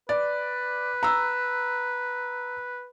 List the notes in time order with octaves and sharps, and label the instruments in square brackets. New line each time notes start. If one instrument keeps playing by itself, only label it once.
[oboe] B4 [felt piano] D5
[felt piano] A#5 E6